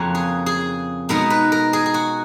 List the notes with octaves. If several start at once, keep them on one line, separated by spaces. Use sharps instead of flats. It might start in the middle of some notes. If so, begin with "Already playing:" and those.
Already playing: F2 C#3 F3 A#3 C#4 F#4
G#4
G#4
B2 G#3 B3 D#4 A#4
B4
A#4
G#4
G#4
F#4